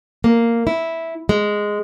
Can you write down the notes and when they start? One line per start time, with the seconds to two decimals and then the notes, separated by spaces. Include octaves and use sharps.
0.24 A#3
0.67 E4
1.29 G#3